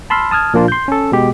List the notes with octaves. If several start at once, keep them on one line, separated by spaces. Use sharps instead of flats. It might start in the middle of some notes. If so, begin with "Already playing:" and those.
A5 B5 C6 E6 F6
A5 D#6 F6 G#6
A#2 F3 A#3 D4 F4
C6 G6
C#4 A4
B2 G#3 G4